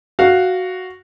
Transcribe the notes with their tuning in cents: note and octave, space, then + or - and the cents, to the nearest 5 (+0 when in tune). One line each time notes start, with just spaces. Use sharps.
F#4 +0 F5 +0